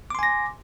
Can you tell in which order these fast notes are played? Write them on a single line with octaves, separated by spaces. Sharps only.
D6 C6 G#5 A#6